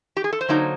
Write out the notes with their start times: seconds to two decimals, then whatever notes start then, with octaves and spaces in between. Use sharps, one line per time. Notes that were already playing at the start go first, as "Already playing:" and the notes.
0.17 G4
0.24 G#4
0.33 A4
0.41 C5
0.49 D3 F#3 A#3 D#4